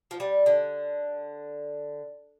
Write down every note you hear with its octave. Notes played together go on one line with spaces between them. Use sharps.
F3
G3
D3